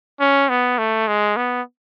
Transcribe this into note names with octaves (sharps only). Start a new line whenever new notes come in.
C#4
B3
A3
G#3
B3